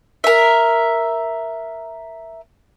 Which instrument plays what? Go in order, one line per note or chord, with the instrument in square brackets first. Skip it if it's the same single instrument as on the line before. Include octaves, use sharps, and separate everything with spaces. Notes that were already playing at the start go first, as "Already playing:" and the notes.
[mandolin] A#4 E5